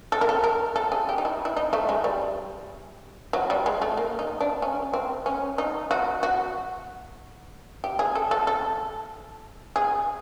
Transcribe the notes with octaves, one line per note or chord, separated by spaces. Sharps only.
A4
A#4
A4
A#4
A4
G#4
G4
D#4
E4
E4
D#4
A3
G#3
G3
F#3
G3
G#3
A3
A#3
D#4
D4
C#4
C4
C#4
D#4
F#4
F#4
G4
G#4
A4
A4
A4
G#4